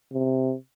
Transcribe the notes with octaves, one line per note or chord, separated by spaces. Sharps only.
C3